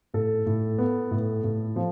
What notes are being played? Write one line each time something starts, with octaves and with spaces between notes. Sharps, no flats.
A2 A4
A2
B3
A2
A2
F3